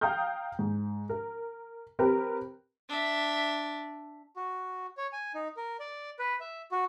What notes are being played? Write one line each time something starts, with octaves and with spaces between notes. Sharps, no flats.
F5 G5 A#5 D#6 F6 G6
G#2
A#4
C4 G4 A#4 B4
D4 E5
F#4
C#5
G#5
D#4
A#4
D5
B4
E5
F#4